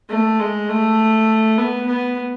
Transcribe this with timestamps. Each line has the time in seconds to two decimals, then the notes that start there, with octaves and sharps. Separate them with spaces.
0.09 A3
0.40 G#3
0.69 A3
1.58 B3
1.87 B3